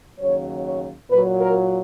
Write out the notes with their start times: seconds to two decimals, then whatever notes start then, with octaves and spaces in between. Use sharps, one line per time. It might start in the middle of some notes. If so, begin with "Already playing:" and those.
0.19 D#2 C#3 F#3 C#5
0.65 C#5
1.10 A#2 F#3 B4
1.41 A#4